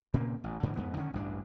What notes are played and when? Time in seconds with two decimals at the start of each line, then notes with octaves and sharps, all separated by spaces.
0.14 A#2 C#3 A#3 C4
0.44 A1
0.63 G#2 D3 E3 G#3
0.76 F2 G#2 B3
0.97 D3 D#3 A#3 C#4
1.13 A1 D2 G2 D4